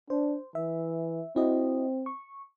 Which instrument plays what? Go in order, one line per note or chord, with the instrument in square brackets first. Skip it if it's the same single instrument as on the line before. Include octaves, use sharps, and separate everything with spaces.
[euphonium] D4 [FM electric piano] C5
[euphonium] E3 [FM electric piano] E5
[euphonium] C4 [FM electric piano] E4 F#4 D#5
[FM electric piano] C#6